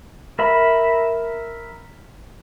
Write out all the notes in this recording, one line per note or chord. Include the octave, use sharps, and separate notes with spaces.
A#4 E5 B5